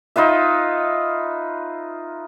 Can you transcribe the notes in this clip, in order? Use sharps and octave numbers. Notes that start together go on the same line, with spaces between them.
D#4 F4 B4 E5